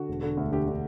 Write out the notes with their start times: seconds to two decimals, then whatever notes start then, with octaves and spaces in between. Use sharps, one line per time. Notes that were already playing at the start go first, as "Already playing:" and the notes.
Already playing: D3 F#4
0.09 E1
0.23 D3
0.37 D2
0.52 D3 G4
0.67 D3